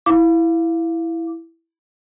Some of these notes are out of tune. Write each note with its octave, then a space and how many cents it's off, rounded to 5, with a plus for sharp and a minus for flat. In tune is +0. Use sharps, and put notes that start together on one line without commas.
E4 +0 F5 +0 D6 -5